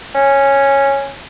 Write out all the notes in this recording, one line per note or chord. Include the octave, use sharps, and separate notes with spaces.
C#4